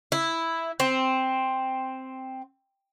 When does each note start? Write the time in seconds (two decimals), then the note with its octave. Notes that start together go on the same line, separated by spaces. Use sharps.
0.12 E4
0.80 C4